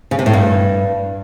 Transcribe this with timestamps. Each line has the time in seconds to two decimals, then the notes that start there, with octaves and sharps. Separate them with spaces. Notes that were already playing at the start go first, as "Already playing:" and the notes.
0.11 C#3
0.19 C3
0.26 A2
0.33 G2